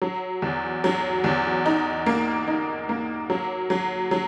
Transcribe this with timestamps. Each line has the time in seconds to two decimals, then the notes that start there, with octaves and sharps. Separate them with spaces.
0.02 F#3
0.42 E2
0.84 F#3
1.24 E2
1.66 D#4
2.06 A#3
2.48 D#4
2.89 A#3
3.30 F#3
3.70 F#3
4.11 F#3